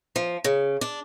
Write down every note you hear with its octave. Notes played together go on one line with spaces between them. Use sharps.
F3
C#3
D4